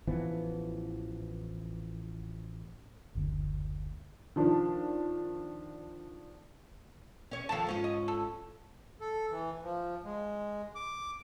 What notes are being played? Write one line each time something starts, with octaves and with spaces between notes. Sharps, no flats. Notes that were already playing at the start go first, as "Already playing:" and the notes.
A1 E3 F3 B3
F#1 D2
D#3 F3 D4
C#4 C#5
D#2 F3 A4 F5 A5
G#2 C#4 F4
D#5
A4
A4
E3
F3
G#3
D6